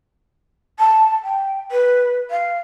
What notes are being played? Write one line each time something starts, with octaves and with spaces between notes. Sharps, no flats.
A5
G5
B4
F5